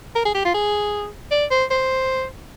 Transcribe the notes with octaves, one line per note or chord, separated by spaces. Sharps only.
A#4
G#4
G4
F4
G#4
D5
C5
C5